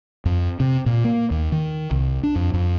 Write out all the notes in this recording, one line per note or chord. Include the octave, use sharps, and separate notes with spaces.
F2
C3
A#2
A#3
D#2
D#3
C2
D4
F2
F2